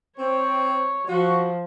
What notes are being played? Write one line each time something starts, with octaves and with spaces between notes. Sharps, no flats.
C4 C#5
F3 F#4